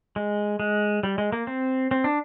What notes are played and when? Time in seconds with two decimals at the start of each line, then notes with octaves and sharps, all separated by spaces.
0.16 G#3
0.60 G#3
1.03 G3
1.18 G#3
1.32 A#3
1.47 C4
1.91 C4
2.04 D4